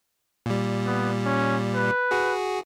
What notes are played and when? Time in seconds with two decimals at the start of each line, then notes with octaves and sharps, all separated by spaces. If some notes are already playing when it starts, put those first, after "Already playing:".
0.46 A#2 G3
0.86 B3
1.25 C#4
1.75 B4
2.11 F#4 G#4